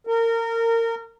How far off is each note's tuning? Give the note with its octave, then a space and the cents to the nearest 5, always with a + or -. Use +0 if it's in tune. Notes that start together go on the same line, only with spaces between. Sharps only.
A#4 -25